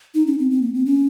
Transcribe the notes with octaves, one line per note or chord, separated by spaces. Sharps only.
D#4
C#4
C4
C4
A#3
C4
C#4